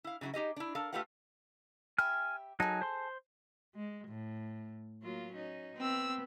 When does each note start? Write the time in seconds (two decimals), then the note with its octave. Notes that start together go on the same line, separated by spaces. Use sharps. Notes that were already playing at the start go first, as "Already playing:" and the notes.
0.04 E4 F5
0.21 C#3 F#3 D#4 E4 F#4
0.34 D#4 G4 G#4 D#5
0.56 D4 E4
0.75 A4 A#4 F5 A5
0.93 A3 F4 G4 B4 F5 F#5
1.98 G4 E5 G#5 B5 F6
2.60 F#3 D#4 G#4 A4
2.82 C5 C6
3.75 G#3
4.08 A2
5.02 F#3 A#3 F4
5.32 C#4 D#4
5.78 B3 C4 E6